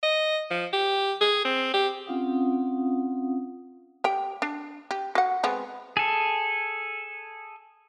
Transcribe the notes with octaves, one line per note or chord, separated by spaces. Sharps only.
D#5
F3
G4
G#4
C4
G4
C4 C#4 F4 F5 F#5 D#6
G4 G5
D4
G4
F#4 F#5
G#3 B3 C4
G#4 A4